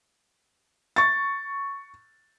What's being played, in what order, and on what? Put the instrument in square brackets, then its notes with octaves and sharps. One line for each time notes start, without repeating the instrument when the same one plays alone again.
[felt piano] C#6 A6